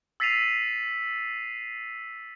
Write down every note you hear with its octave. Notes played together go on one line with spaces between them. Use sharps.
E6 A6 B6 C7 D#7 F7